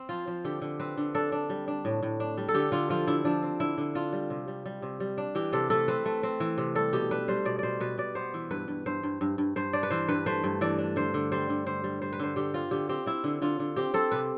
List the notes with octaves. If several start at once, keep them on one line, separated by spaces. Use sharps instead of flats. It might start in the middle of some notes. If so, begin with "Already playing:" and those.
Already playing: C4
F3 F4
F3
D3 G4
D3
C4 B4
D3
D4 A4
D4
G3
D4
A2
A2
D4
G3
A4
D3 G4
D3 F4
F3 F4
D3 E4
F3 D4
C4
D3 E4
D3
D4 F4
G3
C3
G3
G3
C3
G3
D4
E3 G4
C3 A4
A3 A4
C4 B4
A3
C4
E3
C3
G3 A4
B2 G4
D4 B4
G3 C5
B2 D5
B2 C5 D5
B2 B4
B2 D5
B3 C5
E3
G2 B4
G2
G2 C5
G2
G2
G2
G2 C5
D4 D5
B4
E3 C5
G2 B4
A3 C5
G2
E3 D5
D4
D3 C5
D3
G3 C5
D3
D3 C5
G3
G3 C5
B4
D3 C5
D3 G4
C4 F4
D3 G4
C4 G4
C4 E4
D3
D3 F4
D3
C4 G4
C4 A4
C3 B4